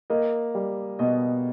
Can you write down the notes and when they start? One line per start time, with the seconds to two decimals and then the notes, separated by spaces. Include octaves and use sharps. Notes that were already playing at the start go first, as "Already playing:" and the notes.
0.10 A#3 D#5
0.55 G3
0.99 B2 D#5